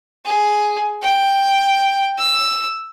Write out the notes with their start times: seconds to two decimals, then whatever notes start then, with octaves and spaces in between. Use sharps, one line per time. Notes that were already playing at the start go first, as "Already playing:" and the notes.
0.25 G#4
1.03 G5
2.18 E6